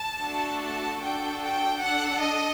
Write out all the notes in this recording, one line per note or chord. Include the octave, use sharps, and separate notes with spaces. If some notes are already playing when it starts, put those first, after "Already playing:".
Already playing: A5
A3 D4 F#4 A4
A5
D4 F#4 A4 G5
G5
D4 A4 F#5
D#5